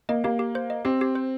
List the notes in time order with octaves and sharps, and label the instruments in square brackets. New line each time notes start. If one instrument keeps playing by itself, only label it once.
[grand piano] A#3 [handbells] D#5
[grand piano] A#3 [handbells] G4
[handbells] G4
C5
D#5
[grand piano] C4 [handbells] G4
[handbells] G4
C5